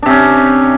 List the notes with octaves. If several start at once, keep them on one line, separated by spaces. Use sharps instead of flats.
C3 C#4 D4